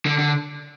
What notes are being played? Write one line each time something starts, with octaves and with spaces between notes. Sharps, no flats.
D3
D3